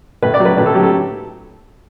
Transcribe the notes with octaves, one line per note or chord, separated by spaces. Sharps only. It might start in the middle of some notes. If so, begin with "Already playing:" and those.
A2 B4
D5
F#3
B4
A2 B4
A4
F#3 G4
A4